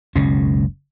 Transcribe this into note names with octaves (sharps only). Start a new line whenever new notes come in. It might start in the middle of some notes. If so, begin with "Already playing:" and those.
F#1 C#2 B2 C#4